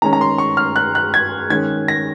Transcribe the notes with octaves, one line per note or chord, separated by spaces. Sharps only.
D#3 G#3 C#4 A#5
A#5
C6
C#6
F6
F#6
F#6
G#6
D#3 G#3 C#4 G#6
A#6